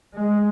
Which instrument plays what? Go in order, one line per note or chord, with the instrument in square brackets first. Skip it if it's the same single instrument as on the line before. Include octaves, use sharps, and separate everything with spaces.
[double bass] G#3